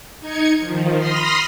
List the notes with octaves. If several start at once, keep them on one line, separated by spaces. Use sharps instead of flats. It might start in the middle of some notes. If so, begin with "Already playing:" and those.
D#4 G#6 C#7
D#3 F3
B5 C6 D#6 F6 A#6 C7